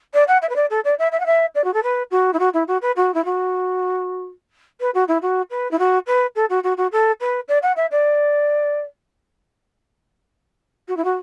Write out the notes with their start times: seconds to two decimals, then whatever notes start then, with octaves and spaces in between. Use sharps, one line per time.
0.14 D5
0.28 F#5
0.42 E5
0.49 B4
0.56 D5
0.70 A4
0.85 D5
0.99 E5
1.12 E5
1.20 F#5
1.26 E5
1.55 D5
1.64 F#4
1.74 A4
1.83 B4
2.11 F#4
2.33 E4
2.39 F#4
2.54 E4
2.68 F#4
2.82 B4
2.96 F#4
3.14 E4
3.25 F#4
4.80 B4
4.94 F#4
5.08 E4
5.22 F#4
5.50 B4
5.71 E4
5.79 F#4
6.07 B4
6.35 A4
6.50 F#4
6.63 F#4
6.77 F#4
6.92 A4
7.20 B4
7.48 D5
7.62 F#5
7.76 E5
7.91 D5
10.88 F#4
10.97 E4
11.04 F#4